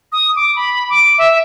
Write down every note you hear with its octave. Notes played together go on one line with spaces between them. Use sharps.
D#6
D6
B5
D6
E5